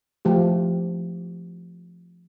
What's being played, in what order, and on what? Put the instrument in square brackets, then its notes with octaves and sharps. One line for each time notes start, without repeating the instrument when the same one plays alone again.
[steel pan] F3 A3 G4